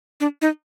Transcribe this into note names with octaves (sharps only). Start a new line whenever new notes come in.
D4
D#4